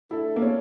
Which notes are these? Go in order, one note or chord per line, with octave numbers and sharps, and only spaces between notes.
A3 D4 E4 A4
A#3
C#4